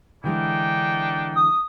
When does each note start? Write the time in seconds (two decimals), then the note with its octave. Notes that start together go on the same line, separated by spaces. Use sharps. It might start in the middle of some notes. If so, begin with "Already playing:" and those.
0.24 D3 E3 G#3 D4 D#4 G5
1.36 D#6